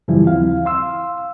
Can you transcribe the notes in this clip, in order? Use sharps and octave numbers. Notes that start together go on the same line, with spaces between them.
F#2 C#3 E3 F3 G3 E4
D#2 C4 E4 F5
F5 C6 E6